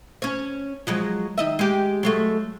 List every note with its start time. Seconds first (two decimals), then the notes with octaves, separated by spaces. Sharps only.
0.22 C#4 C#5
0.87 F3 F#3 G#3
1.38 D#3 D#5 E5
1.59 G#3 G4
2.03 F#3 G#3 A3